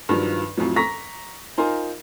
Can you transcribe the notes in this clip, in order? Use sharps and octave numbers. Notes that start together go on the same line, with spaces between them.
G2 D#3 F3 F#3
F2 A2 F3 F#3
A#5 C#6 A#6 B6
D#4 F4 A#4 C5 G#5